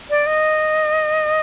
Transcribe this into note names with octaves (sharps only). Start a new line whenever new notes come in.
D5
D#5